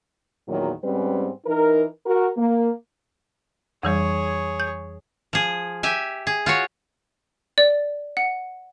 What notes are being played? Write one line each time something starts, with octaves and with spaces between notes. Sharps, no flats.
E2 A#2 D#3 F#3
G#2 G3 C4 C#4 B4
E3 D#4 A#4
F#4 A#4
A#3
F2 E3 G3 G#4 C#5
G6
F3 G#4
G4 E5 G#5
G#4
F4 F#4 C#5
D5
F#5